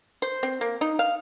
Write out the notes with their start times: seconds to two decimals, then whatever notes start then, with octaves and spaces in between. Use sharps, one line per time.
0.22 C5
0.43 C4
0.61 A#3
0.81 D#4
0.99 F5